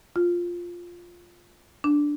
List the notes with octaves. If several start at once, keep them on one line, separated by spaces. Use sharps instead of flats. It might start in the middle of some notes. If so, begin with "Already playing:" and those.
F4
D4